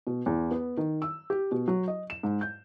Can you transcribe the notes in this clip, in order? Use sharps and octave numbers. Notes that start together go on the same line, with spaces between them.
B2
E2
B3
D#3
E6
G4
B2
F#3
D#5
E7
G#2
G6